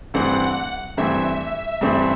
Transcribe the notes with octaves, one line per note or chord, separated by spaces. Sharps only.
G2 E3 A3 C4 F#5
G2 E3 A3 C4 E5
G2 E3 A3 C4